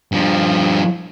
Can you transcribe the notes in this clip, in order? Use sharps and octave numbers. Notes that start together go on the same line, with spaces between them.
G2 F3